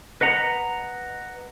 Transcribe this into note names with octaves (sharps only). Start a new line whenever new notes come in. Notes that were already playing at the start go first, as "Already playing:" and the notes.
B4 D#5 F#5 A#5